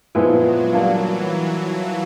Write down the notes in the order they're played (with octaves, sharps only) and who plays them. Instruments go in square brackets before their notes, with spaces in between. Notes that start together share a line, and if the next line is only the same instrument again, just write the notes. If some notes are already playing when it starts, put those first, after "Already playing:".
[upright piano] A#2 F3 G#3 B3 E4 [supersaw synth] F#3
[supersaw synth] E3 [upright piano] G3 A#3 D4 F4